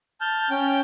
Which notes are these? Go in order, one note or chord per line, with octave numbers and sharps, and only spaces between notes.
A5 F6 G6
C#4 G5